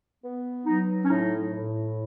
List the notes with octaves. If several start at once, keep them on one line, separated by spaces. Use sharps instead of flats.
B3
F#3 D#4
C#4
A2 D#4
A2